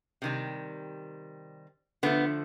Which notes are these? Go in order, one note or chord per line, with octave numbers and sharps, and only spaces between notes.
C3 D#3 G3
D3 F3 A3 B3